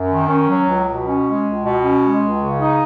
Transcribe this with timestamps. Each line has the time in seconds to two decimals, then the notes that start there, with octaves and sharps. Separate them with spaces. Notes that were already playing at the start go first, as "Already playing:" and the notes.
Already playing: F#2
0.10 D#3
0.28 C#4
0.48 F#3
0.68 C#2
0.86 B2
1.06 C#4
1.25 G#3
1.44 C#2
1.64 B2
1.83 C#4
2.02 G#3
2.22 C#2
2.41 C#3
2.60 D#4